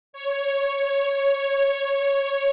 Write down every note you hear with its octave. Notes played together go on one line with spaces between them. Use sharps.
C#5